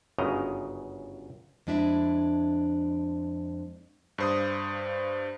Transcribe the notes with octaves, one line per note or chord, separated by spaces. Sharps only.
G1 F#2 C#3 D#5 A#5
F2 G#3 D4 E4 E5
G2 C5 D#6